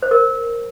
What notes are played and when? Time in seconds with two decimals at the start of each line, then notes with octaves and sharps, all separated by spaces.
0.02 C5
0.11 A#4